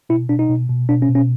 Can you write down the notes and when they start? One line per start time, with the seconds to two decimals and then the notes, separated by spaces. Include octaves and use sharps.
0.09 B2 E4
0.29 B2 D4
0.39 D#4
0.49 B2
0.69 B2
0.89 B2 D4
1.02 C#4
1.09 B2
1.15 C#4